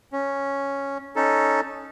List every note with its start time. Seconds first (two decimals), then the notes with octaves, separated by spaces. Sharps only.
0.12 C#4
1.16 C#4 D#4 A4